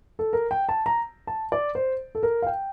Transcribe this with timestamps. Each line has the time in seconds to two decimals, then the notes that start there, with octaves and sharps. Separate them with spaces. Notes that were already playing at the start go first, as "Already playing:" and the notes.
0.19 A4
0.33 A#4
0.51 G5
0.69 A5
0.86 A#5
1.27 A5
1.52 D5
1.75 C5
2.15 A4
2.23 A#4
2.42 F5
2.47 G5